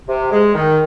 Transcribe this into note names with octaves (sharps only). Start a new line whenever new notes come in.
C3
G#3
D#3